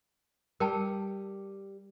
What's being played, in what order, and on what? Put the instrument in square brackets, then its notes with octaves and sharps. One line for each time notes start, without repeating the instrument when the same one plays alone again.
[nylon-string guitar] G3 [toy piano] A#4 G5 A5